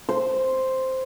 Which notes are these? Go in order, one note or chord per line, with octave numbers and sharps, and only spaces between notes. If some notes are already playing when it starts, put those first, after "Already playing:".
C5